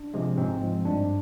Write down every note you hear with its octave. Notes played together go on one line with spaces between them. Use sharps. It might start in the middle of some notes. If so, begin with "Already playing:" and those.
Already playing: D4
C3 F3 G#3
G#2 C4
F3 G#3
G2 D4